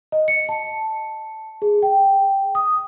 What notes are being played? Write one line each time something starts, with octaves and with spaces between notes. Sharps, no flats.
D#5
C#7
A5
G#4
G5
D#6